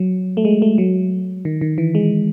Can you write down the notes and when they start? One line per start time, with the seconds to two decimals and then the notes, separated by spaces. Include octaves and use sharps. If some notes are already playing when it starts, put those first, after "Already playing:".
Already playing: F#3
0.37 A3
0.45 G#3
0.62 A3
0.78 F#3
1.45 D#3
1.61 D#3
1.78 E3
1.95 G#3